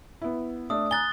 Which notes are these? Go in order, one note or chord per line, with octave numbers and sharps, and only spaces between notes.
B3 E4
A3 D4 D#6
G#5 A#5 F#6 A6 G7